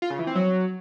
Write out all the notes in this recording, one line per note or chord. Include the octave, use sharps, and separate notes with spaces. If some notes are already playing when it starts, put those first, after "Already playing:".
F4
C#3
E3
C4
F#3